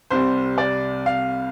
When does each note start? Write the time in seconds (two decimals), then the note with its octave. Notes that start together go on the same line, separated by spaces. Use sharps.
0.10 C2 C3 G3 C5
0.58 D5
1.06 F5